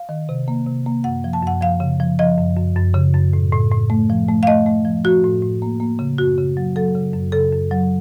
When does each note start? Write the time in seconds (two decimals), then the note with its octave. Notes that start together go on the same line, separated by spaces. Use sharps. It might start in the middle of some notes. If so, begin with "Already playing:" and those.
Already playing: F5
0.09 D#3
0.29 C3
0.48 A#3
0.66 C3
0.86 A#3
1.04 F#2 F#5
1.24 F3
1.33 A5
1.43 F#2 F#5
1.61 F3 F5
1.80 C#3
2.00 F3
2.19 F3 D#5
2.38 F#2
2.56 F#2
2.76 F#2
2.94 C#3
3.14 F#2
3.33 A2
3.53 A2
3.71 A2
3.90 A3
4.10 F3
4.28 A3
4.43 F5
4.47 A3 D#5
4.66 A3
4.85 F3
5.05 F3 F#4
5.24 A2
5.42 A2
5.62 A#3
5.80 A#3
5.99 C#3
6.18 F#2 F#4
6.38 C#3
6.57 F#3
6.76 F#3 A4
6.95 C#3
7.13 F#2
7.32 C#3 A4
7.52 F#2
7.71 F#3